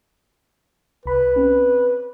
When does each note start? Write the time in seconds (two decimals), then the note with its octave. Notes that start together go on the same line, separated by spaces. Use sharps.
1.06 C2 B4 B5
1.36 C4 C#4